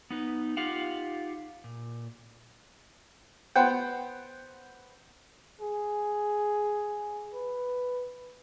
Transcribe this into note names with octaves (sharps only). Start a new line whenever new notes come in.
B3 D#4 B4
D#4 F4 G4 F5 F#5
A#2
B3 C5 F#5 G5
G#4
B4